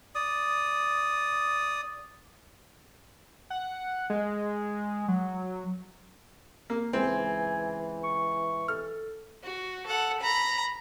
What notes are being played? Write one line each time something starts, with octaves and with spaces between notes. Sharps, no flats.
D5 D#6
F#5
G#3
F#3
A#3
C#2 E3 C4 G#5
C#6
A4 F6
F#4
A4 F#5
A#5 B5